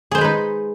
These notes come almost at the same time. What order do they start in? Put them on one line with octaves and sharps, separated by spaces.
G#4 C5 G#3 B4 D#4